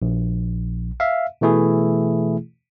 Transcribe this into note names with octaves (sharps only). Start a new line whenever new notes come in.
A#1
E5 F5
B2 E3 A3 E4 G#4